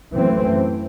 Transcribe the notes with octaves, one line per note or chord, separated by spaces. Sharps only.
F#2 E3 A3 C4